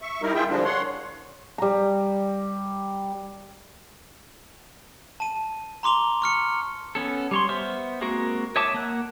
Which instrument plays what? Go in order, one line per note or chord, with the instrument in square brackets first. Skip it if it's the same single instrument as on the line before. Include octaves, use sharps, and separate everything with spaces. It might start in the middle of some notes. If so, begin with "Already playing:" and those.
[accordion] E5 C#6
G3 D#4 E4 A#4
E3 E4 F4 G#4 E5 G5
D3 F3 G3 G#3 A#3 D4
C#5 F#5 C6
[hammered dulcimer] G3 A#5
[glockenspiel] A5 D#7
A#5 C6 D6 F7 G7
C#6 F6 C#7
[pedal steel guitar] B3 C#4 A4
G3 C#5 C6
B3 C5 E5 F6
G#3 A#3 C4 F#4 A#4
C#5 D#5 E5 A5 D6
A#3 A#4 F#5 F#6